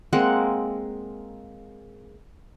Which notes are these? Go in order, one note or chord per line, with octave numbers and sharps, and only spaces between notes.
G#3 A#3 C4 F#5